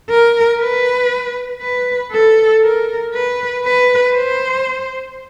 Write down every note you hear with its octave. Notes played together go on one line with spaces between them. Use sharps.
A#4
B4
B4
A4
A#4
B4
B4
C5